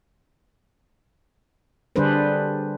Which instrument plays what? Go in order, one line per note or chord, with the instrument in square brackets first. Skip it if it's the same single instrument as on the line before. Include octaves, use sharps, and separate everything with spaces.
[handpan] D3 G3 D4 G#4 B4 C5